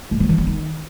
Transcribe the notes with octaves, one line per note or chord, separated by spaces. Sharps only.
A2
F3
E3
B3
D#3